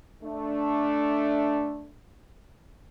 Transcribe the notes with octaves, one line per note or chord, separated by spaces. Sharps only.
A3 D4